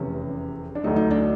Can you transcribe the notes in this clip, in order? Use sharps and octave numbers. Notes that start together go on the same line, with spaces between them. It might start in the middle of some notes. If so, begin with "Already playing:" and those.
Already playing: F1 E2 C3 C#4
D4
D2 D3 F#3 A3 D#4
D#4
D4